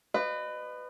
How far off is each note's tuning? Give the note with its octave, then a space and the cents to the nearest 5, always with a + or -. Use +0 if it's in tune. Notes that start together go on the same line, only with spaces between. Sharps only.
B4 +20 D#5 -30